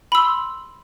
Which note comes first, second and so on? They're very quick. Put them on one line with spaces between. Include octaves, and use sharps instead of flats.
B5 E6 C6